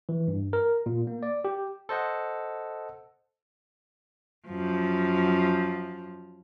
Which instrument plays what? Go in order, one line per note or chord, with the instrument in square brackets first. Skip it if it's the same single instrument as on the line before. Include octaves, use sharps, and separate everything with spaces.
[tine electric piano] E3
G2
A#4
A#2
A#3
D5
G4
A4 C5 D#5 F#5
[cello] F#2 F3